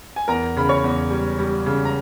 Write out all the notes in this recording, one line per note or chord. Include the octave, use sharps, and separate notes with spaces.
G#5
E2 A#4 A#5
C#3 B5
C#5 C#6
E2
G3
G3
C#3
A#5